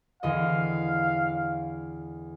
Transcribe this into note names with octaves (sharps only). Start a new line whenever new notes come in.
E2 D3 D#5 F5